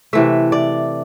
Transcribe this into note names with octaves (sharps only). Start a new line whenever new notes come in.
C3 E3 A3 E5
D5